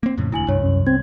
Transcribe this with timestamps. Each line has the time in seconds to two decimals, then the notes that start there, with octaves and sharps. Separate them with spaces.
0.03 A#3 C4
0.18 F2 A2 C#3
0.32 E1 D2 E4 G#5 F#7
0.48 C2 G2 C#5
0.63 F#2
0.87 C4 G#6